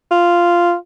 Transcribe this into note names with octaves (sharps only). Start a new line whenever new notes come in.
F4